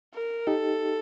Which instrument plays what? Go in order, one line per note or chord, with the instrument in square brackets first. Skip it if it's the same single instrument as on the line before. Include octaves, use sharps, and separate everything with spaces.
[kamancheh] A#4
[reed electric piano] D#4 G4 [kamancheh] A4